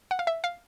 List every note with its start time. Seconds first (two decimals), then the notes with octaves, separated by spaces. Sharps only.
0.11 F#5
0.19 F5
0.27 E5
0.44 F5